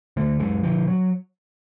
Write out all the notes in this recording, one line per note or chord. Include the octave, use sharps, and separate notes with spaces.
D3 A3
F#2 G#3
D3 F3
F#3